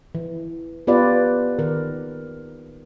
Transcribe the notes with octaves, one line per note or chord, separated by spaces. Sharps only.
E3
B3 F4 G4 B4 D5 F5
D#3 A#4